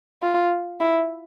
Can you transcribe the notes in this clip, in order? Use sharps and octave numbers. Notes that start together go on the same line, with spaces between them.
F4
E4